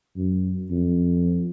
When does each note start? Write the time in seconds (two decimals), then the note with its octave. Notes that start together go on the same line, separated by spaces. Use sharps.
0.17 F#2
0.71 F2